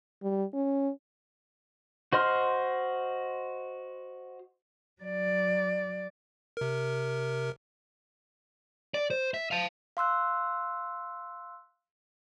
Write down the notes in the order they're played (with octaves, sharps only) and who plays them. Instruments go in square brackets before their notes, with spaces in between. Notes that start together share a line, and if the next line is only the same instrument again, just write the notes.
[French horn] G3
C#4
[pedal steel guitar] F#4 C5 D#5 C6 F6
[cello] F#3 D5
[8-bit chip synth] C3 A#4
[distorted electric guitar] D5
C5
E5
F5 A5
[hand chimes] F5 C6 E6 F#6